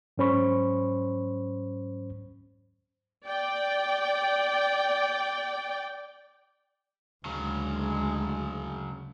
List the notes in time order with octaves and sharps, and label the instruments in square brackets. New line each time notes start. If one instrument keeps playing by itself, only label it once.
[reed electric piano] G#2 F#3 C#4 C5 B5 C#6
[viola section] D5 G5
[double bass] D2 G#3 [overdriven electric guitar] C#3 F#3